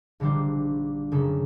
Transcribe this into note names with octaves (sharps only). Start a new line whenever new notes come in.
A#1 D3 D#3 G3 D4 C5
F#1 C#3 A#3 C#4 A4